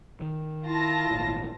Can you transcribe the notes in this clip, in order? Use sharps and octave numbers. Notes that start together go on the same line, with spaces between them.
D#3
E4 F4 A5 A#6
G#1 A#2